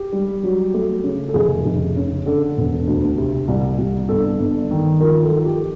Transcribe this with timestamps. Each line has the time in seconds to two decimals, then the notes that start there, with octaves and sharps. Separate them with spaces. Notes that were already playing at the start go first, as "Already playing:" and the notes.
Already playing: G4
0.12 G3
0.43 F#3
0.74 A3
1.04 C#3
1.28 A4
1.34 F1 G#4
1.65 F1
1.96 C#3
2.26 D3 A4
2.57 E1
2.87 D2
3.18 C3
3.48 C2
3.78 C2
4.09 G1 A4
4.40 G1
4.71 D#3
5.00 F3 A#4
5.24 A4
5.31 F3
5.46 G4